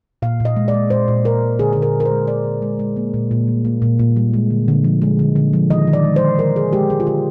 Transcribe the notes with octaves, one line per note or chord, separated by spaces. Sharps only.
A#2 F5
A#2
D#5
G#3
D5
G#3
A#2 C5
A#2
G#3 A#4
G#3
D3 G#4
D3 G#4
A#4
G#3
A#4
C5
G#3
D3 D5
D3
G#3
G#3
A#3
A#2
A#2
G3
A#3
A#2
A#2
G3
G#3
D3
D3
F3
G#3
D3
D3
F3
D#3 D#5
D#3
D5
G#3
C5
G#3
D#3 A#4
D#3 G#4
G#3 G4
G#3 G#4
F4
D3 G4